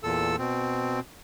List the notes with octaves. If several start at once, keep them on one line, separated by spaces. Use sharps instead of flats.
E2 A#2 A4 E6
B2 C4